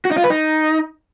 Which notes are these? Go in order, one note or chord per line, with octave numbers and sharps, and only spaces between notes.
F#4
D#4
F4
B4
D#4